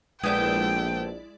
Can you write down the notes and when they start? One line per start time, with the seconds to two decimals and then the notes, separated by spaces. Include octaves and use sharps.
0.23 A#1 G#3 B3 C4 E4 A4 D5 G5